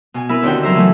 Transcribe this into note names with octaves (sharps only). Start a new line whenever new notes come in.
B2 G#5
B3 C4 E4 A#4 B4 E5
D#2 D3 C4 D#4 F#4 G5
C#3 F#3 A#4 C5 E5
E3 F#3 A3